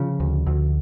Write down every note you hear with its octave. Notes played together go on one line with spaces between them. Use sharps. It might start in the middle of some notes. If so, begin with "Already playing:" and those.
Already playing: C#3 F3
D2
D2